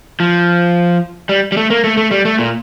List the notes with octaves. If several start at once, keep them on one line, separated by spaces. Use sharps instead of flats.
F3
G3
G3
A3
A#3
A3
A3
G3
A3
A#2